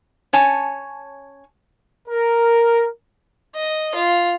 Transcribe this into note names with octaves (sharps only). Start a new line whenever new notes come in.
C#4 C#5 G#5 A5
A#4
D#5
F4